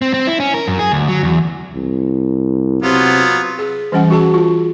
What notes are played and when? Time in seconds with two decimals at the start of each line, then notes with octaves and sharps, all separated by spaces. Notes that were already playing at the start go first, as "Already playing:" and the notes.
0.02 C4
0.14 C4
0.27 E4
0.40 C#4
0.54 A#4
0.68 F#2
0.79 G#4
0.92 D2
1.08 F#3
1.23 E2
1.74 C2
2.82 C3 F#3 B3 F4
3.59 G#4
3.92 E3 G3 C#4 F#5
4.10 F#4 G#4 A5
4.34 F4